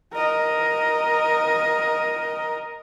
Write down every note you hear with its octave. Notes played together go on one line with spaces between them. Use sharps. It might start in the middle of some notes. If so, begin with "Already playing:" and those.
A#4 D#5